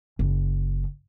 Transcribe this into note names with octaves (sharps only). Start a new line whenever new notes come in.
F#1